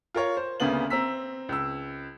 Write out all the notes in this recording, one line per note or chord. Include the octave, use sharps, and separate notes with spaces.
F4 A#4 C#5
C5
D2 C#3 A#3 B3 F#7
C4 A#5 E6 B6
C#2 E6